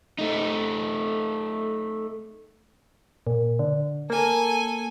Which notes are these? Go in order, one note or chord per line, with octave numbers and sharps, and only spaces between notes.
A3 D#4
A#2
D3
A#3 A4 G#5